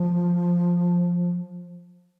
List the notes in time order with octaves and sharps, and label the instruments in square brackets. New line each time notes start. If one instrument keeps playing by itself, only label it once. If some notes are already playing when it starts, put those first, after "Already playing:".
Already playing: [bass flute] F3